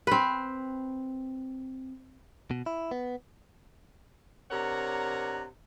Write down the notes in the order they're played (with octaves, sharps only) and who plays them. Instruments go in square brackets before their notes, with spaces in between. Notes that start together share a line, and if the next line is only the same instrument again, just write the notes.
[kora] C4 B4
[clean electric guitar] B2
E4
B3
[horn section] C3 D4 A#4 C#5 F#5 A#5